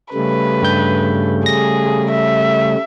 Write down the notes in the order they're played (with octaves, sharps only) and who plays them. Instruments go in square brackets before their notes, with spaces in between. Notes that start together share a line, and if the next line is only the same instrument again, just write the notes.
[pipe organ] C#3 G3 A3 [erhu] B4
[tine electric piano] G2 G6
[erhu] G#4 [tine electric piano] A#6
[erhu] E5